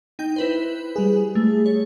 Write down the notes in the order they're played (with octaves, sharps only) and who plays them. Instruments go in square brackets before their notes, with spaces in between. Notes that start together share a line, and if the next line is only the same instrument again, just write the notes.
[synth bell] D#4 G5 G6
E4 B4 C5
[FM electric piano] G3 G#4
[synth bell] A3
C#5